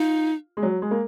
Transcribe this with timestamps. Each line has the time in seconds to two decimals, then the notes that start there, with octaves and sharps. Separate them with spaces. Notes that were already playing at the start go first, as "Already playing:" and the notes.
Already playing: D#4 F4
0.57 G#3
0.63 F#3
0.82 G#3
0.91 A#3